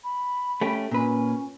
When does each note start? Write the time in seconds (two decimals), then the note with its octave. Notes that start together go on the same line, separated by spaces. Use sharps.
0.04 B5
0.61 A3 C#4 G4
0.91 A#2 C#4 B4